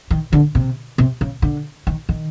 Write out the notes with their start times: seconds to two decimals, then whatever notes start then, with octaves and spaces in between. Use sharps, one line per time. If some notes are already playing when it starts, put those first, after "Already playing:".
0.11 D#3
0.33 D3
0.55 C3
0.98 C3
1.21 C#3
1.42 D3
1.87 D#3
2.09 D#3